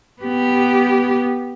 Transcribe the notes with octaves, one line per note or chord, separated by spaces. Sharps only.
B3 G4